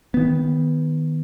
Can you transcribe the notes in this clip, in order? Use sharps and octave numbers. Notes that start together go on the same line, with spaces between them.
D#3 B3